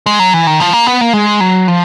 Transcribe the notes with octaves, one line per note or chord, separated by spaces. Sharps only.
G#3
F#3
E3
D#3
F3
A#3
B3
A#3
G#3
F#3
F3